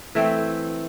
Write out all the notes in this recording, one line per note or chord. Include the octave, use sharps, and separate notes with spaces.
E3 A3 C4 G5